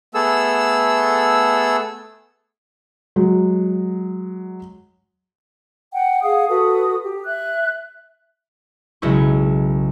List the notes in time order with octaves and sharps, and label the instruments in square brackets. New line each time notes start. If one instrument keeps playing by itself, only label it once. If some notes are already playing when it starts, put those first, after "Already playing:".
[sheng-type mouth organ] A3 B3 G#4 A4 E6
[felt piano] F#3 G#3
[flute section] F#5 G5
G#4 F5 F#5 D#6
F#4 A4 B4 D#6
G4
E5 F#6
[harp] B1 C#3 G#3 C#4 E4 C#6